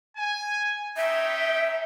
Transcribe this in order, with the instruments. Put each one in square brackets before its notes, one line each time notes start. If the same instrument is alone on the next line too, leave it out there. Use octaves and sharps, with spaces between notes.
[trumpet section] G#5
[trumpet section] C#4 D#4 G5 [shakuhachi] E5